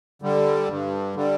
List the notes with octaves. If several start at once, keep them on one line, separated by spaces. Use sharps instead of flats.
D3 G3
G2
D3 G3